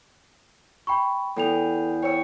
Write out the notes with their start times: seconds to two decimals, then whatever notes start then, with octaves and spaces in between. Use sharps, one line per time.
0.87 G5 B5 C#6
1.36 E2 A4 G5 F7
2.03 C#5 G5 E6 C#7